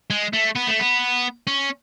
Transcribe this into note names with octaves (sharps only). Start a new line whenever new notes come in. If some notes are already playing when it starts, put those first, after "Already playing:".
G#3
A3
B3
A3
B3
C#4